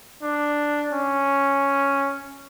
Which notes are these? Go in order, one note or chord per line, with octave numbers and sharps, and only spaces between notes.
D4
C#4